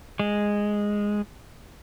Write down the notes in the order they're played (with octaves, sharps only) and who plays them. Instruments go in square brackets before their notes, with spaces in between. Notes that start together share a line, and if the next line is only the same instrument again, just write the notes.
[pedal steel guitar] G#3